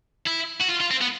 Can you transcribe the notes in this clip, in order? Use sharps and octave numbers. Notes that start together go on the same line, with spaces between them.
E4
F#4
F4
F4
C4
B3